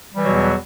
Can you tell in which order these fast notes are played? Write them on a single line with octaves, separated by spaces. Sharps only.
G3 E3 F#3 B2 E2